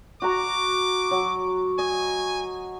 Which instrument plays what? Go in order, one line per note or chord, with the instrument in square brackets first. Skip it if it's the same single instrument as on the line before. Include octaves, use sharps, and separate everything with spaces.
[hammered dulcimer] F#4 A#5 [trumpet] D6
[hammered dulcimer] F#3
[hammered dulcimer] D#5 [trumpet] G#5